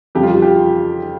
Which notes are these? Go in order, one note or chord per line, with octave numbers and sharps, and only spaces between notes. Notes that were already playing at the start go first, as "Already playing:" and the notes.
F2 C#3 G3 G4
F4
G4
G4
F4